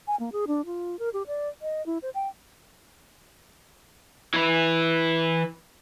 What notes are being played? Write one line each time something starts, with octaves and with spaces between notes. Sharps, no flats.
G#5
A#3
G#4
D4
F4
A#4
G4
D5
D#5
E4
C5
G5
E3 E4